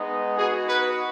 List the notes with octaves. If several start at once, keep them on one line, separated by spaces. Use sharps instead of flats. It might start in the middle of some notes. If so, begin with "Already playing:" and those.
Already playing: G#3 B3 D#4
B3 D#4 F#4 G#4
B4